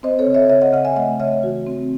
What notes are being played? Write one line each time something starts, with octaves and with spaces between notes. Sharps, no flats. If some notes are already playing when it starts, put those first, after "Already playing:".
C4 C5 D#5
A4 C#5
C#3
C#5 E5
C#3 C#5 E5
D#5 F#5
C#3 D#5 F#5
E5 G#5
A3 D#5 F#5
C#3 C#5 E5
E3 F#4
C4